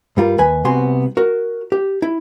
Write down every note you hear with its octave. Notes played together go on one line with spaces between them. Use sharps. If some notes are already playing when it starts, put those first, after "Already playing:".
G2 G3 F4 A#4
D#2 B4 G#5
C2 C3 B3 F#4 G#5 C6
F#4 A#4
G4
E4